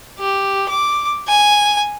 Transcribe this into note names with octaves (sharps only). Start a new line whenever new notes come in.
G4
D6
G#5